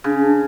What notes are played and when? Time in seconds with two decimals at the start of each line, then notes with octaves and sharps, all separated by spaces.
0.04 C#3 D4
0.12 C#4
0.22 D4